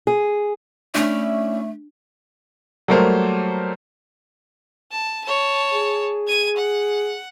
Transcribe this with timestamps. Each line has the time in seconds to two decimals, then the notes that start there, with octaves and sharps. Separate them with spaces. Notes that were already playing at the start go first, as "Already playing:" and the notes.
0.07 G#4
0.95 A3 C#4 D4 E4 D5
2.88 F#3 G3 A3 A#3 A#4 C5
4.91 A5
5.24 C#5 A5
5.74 G#4
6.28 G#6 D#7
6.56 F#5